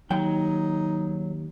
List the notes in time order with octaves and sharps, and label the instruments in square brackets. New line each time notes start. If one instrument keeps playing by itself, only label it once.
[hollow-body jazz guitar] D#2 G5 [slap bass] F#3 [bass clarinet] D#4